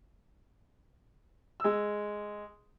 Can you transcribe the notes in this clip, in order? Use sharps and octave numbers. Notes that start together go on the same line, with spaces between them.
G#3 E6